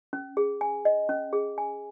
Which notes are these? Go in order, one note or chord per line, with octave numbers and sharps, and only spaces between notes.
C#4
G#4
G#5
D#5
C#4
G#4
G#5